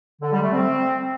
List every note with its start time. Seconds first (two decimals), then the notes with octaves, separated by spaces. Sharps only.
0.22 D3
0.32 G3
0.42 A3
0.52 C4